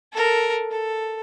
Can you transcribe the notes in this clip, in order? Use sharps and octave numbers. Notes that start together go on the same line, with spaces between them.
A4 A#4
A4